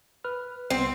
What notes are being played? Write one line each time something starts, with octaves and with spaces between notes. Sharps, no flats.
B4 F6
C2 B3 C4